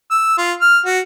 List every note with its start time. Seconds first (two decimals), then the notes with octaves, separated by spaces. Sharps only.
0.11 E6
0.38 F4
0.61 F6
0.86 F#4